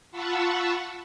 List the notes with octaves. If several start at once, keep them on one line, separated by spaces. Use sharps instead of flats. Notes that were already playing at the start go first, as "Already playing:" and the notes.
F4 F#5 A5 B5 C#6 E6